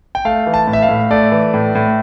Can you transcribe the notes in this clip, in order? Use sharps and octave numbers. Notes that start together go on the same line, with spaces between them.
G5
A3 F5
E3
A5
A2
E5
F5
A2
A3 D5
E3
A2
A2